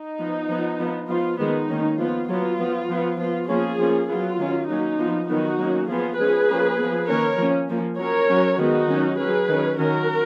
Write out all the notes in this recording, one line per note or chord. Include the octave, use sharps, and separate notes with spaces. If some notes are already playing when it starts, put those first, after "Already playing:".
Already playing: D#4
F3 B3
F3 B3
F3 B3
F3 B3 F4
D#3 G#3 B3 D#4
D#3 A#3 C#4
F3 B3 F4
F#3 B3 F4
F3 B3
F3 B3
F3 B3 F4
F3 A#3 C#4 F4 G#4
F3 A#3 C#4
F#3 B3 F4
D#3 F#3 C#4
F#3 A#3 C#4 D#4
F3 B3
D#3 F#3 B3 D#4 F#4
F#3 A#3 C#4
F3 B3 F4 G#4
F3 G#3 C#4 G#4 B4
F3 A#3 C#4
F3 B3
D#3 A#3 C#4 A#4 C#5
F3 A#3 C#4
F3 A#3 C#4
F#3 C#4 A#4 C#5
F#3 C#4
D#3 G#3 B3 D#4 F#4
D#3 F#3 C#4
F#3 C#4 G#4 B4
D#3 F#3 C#4
D#3 F#3 C#4 F#4 A#4